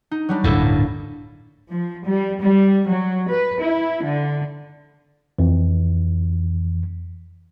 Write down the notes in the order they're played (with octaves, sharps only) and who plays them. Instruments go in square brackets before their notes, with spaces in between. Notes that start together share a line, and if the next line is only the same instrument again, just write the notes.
[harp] D#4
F#3 G3 D4
[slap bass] D1 G2 A#2 [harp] A#3 E4 A4
[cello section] F3
G3
G3
F#3
B4
E4
D3
[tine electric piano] F2 E3